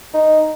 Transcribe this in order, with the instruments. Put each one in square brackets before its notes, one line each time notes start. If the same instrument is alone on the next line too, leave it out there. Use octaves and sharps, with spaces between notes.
[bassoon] D#4